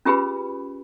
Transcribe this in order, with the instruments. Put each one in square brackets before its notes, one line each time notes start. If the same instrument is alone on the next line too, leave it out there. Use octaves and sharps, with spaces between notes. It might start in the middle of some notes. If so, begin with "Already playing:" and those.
[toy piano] C#4 F4 G4 G#4 B4 B5